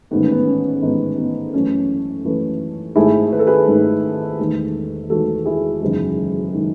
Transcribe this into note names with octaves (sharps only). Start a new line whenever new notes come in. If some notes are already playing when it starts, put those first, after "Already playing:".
A1 G#2 D#3 A3 B3
C#4
B3
C#4
A1 G#2 D#3 A3 B3 D#4
B3
F#2 E3 A3 C#4
F#2 E3 A3
G#1 G#2 D#3 A3 E4 G#4
B4
A4
G#4 B4
G#1 G#2 D#3 A3
E1 E2 D#3 A3
E1 E2 D#3 A3 F#4 A4
E4 G#4
F#1 E2 D#3 G#3
D#3 G#3